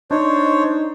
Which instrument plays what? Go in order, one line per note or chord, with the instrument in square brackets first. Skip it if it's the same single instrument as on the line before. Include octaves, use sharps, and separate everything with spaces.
[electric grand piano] D4 [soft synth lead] D#4 [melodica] C5 C#5